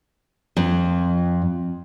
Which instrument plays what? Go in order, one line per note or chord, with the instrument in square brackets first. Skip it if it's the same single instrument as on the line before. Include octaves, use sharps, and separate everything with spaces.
[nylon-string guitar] F2